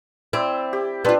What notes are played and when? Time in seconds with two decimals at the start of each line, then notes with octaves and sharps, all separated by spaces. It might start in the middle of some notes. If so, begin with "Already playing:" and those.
0.33 C4 E4 D5
0.73 G4
1.05 B3 C4 D4 F4